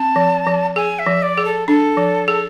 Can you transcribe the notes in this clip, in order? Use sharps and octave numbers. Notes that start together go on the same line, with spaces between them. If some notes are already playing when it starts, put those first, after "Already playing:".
Already playing: C4 A5
F3
F3
G#4 G#5
E5
F3
D5
G#4
A4
D4 A4
F3
G#4